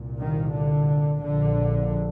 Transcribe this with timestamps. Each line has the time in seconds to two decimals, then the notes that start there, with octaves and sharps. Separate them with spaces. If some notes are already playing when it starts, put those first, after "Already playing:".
Already playing: C2 A#2
0.19 D#3
0.53 D3
1.20 A#1 A#2 D3